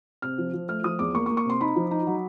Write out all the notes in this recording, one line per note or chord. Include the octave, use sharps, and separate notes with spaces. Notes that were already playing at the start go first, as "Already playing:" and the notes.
C3 F6
F3
F3
A3 F6
F3 D#6
E2 D6
A#3 C#6
C#6
A#3
C#6
C3 C6
D#4 B5
F3
D#4
F#3